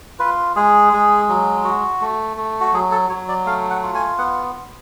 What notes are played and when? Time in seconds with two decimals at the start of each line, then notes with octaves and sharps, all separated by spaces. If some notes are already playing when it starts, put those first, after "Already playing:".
0.19 F4 B4
0.56 G#3 G#4
0.93 G#3
1.29 F#3
1.64 F#4
2.01 A3
2.37 A3
2.60 F#4
2.73 F#3 G#4
2.91 A4
3.09 F#3 C#5
3.28 D5
3.46 A3 F5
3.70 F#5
3.83 F4
3.95 G#5
4.18 B3 F#5